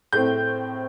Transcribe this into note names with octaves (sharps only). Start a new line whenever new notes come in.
A2 A3 C4 G6